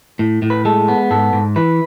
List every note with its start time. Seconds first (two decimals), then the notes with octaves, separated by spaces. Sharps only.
0.19 A2
0.42 A2
0.50 B4
0.65 G#3 A4
0.88 B3
1.11 G#2 A4
1.33 G#2
1.56 E3 B4